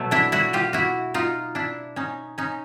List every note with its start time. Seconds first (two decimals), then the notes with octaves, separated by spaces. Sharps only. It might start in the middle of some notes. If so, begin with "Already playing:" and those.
Already playing: B2 F#3 A3
0.11 D4 E4
0.32 E4 F#4
0.53 F4 G4
0.73 E4 F#4
1.14 D#4 F4
1.55 D4 E4
1.96 C#4 D#4
2.38 C#4 D#4